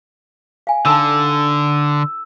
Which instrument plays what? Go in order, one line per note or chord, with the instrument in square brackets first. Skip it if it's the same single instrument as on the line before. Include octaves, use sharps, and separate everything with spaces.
[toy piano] F5 G#5
[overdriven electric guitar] D3 [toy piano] D#4 A4 A5 [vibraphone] E6